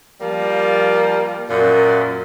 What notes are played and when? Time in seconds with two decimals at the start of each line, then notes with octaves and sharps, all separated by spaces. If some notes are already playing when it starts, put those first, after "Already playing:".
0.21 F3 G3 A#3
1.49 F#2 A#2